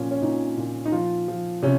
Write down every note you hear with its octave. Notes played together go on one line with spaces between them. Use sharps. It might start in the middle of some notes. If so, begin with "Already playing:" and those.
Already playing: A#2 F3 C#4
C#4
A#2 D#4
A#2
D#4
F3 F4
F3
C3 C#4